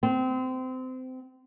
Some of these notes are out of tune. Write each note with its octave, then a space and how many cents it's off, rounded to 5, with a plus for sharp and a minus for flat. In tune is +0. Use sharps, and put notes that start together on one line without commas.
C4 -25